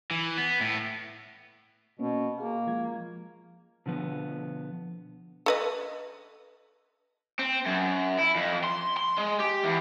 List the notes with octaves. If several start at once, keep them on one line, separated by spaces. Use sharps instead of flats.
E3
B3
A2
B2 A#3 B3 C#4
A#3 F#4 G#4 F5
F3 G#3 G#6
B2 D3 F3 B3
A4 B4 D#5
C4
F#2
E4
F2
C6
C6
G#3
G4
E2